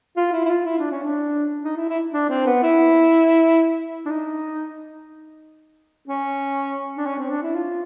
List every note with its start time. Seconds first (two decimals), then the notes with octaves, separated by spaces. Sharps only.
0.17 F4
0.33 E4
0.45 E4
0.49 F4
0.66 E4
0.78 D4
0.91 C#4
1.03 D4
1.64 D#4
1.77 E4
1.89 E4
2.13 D4
2.30 C4
2.46 B3
2.63 E4
4.06 D4
4.10 D#4
6.08 C#4
6.97 D4
7.06 C#4
7.18 C4
7.30 D4
7.43 E4
7.55 F4